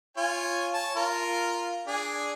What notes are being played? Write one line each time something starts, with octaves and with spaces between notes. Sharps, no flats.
F4 C#5 G#5
C#5 A5
F4 A#4
D4 G#4